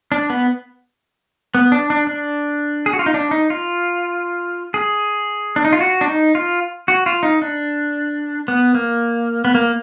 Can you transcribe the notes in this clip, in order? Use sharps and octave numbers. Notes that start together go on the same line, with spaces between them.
D4
B3
B3
D4
D4
D4
G#4
F#4
F4
D#4
D4
D#4
F4
G#4
D4
D#4
F4
F#4
D4
D#4
F4
F#4
F4
D#4
D4
B3
A#3
B3
A#3